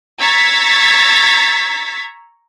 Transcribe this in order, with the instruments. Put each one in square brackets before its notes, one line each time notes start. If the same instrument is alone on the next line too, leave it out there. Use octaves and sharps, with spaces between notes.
[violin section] A#5 C#6 E6 G#6 A6 B6